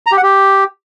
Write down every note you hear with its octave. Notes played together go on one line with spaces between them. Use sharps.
A#5
G4
F#5
G4